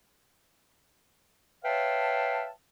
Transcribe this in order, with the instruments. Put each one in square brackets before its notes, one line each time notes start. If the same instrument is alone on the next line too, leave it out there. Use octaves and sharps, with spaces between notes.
[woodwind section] B4 C#5 E5 F5 G5 A5